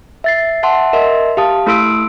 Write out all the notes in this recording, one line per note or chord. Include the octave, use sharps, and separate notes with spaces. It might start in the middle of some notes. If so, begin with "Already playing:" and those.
E5 A6 C7
E5 F#5 A5 C6
A#4 D#5 E5 C6
G4 F5 A5 D#6
A3 E4 A4 C6 E6 D7